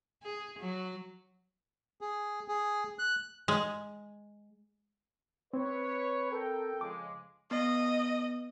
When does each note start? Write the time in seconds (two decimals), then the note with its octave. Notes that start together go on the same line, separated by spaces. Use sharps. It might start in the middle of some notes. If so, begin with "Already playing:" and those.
0.23 G#4
0.59 F#3
2.01 G#4
2.48 G#4
2.99 F#6
3.48 G#3
5.53 C4 B4 C#5
6.31 A4 A#4 G5
6.81 C#3 F3 G#3 D6
7.51 B3 D#5